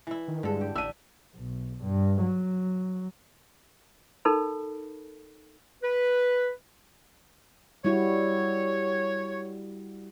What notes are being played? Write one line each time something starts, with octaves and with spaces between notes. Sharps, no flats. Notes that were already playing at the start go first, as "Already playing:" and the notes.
E3 E4
D#3
G2 D3 G#3 A4
G4
A1 D4 E5 E6 D#7
B1
G2
F#3
D#4 A4 A#4 B5
B4
G3 E4 F#4 C#5